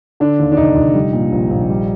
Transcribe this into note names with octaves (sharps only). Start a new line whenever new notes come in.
D3 D4
D#2
D4
F1 D#4
F1
G3
A#2
A#1
A#1
G3